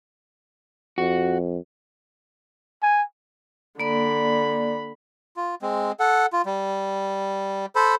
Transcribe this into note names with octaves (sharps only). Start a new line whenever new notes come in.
F2 F#4
G#5
D3 A#3 D5 B5
F4
G#3 C4
A4 F#5
F4
G3
A4 C5 B5